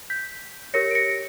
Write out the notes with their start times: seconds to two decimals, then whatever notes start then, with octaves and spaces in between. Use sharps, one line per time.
0.10 G6 B6
0.74 G4 A#4 C#5 A#6 C#7
0.91 D7
0.95 A#6 C#7